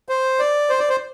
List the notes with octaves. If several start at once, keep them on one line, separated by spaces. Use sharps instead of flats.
C5
D5
C5
D5
C5